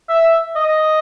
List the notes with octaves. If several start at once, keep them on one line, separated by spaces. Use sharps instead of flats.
E5
D#5